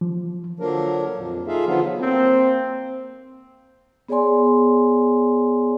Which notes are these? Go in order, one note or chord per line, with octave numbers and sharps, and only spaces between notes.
F3
D3 F3 F#3 A#3 D4 A#4
F2 A#2
D#4 F4 G#4 A4 E5 F5
D3 F3 F#3 B3 F4
A#3 C4
B3 G#4 C#5 D5 G#5 C6